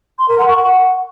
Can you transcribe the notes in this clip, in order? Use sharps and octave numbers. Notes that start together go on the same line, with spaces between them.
C6
A#4
F#5
C#6
F#5